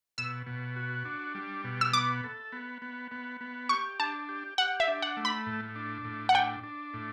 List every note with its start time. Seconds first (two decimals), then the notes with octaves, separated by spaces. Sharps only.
0.18 B2 E6
0.47 B2
0.76 F#4
1.05 D4
1.35 G3
1.64 B2
1.81 E6
1.93 B3 D6
2.24 A4
2.52 B3
2.82 B3
3.11 B3
3.41 B3
3.69 G4 C#6
4.00 D4 A5
4.29 G4
4.58 G4 F#5
4.80 E5
4.88 D4
5.02 F#5
5.17 A3
5.25 B5
5.46 A2
5.76 D4
6.05 A2
6.29 F#5
6.34 D4 G5
6.63 D4
6.94 A2